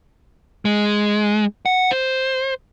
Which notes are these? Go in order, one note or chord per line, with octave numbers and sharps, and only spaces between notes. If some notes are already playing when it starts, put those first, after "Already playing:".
G#3
F#5
C5